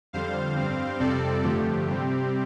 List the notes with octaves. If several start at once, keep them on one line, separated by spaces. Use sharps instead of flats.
F2 D3 G3 C5 F5
G2 G3 C4
F2 C3 G3 C4 A4 D5
G2 D3 F3 A3 G4
C3 G3 C4